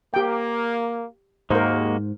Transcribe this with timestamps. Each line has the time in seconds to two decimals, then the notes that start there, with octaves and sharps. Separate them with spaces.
0.14 A#3 G4 G5
1.51 D#2 G#2 G#3 A#3 F#4 A#4 C5